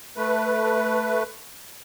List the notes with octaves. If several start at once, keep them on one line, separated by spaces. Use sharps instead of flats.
A3 B4